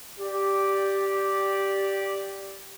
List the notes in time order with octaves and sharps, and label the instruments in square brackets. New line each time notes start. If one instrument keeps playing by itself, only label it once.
[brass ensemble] G4 D5